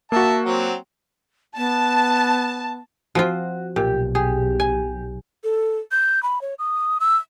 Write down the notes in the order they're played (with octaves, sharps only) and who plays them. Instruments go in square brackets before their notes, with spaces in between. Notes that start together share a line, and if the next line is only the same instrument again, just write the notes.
[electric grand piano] A#3 F#4 [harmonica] E5 A5
[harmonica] F#3 C4
[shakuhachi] B3 [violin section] A5
[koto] F3 C4 F4 [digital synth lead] F#4
[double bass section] B1 [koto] A#2 [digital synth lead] G4
[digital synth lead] G4 [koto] G#4
[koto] G#5
[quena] A4
G6
B5
C#5
D#6
E6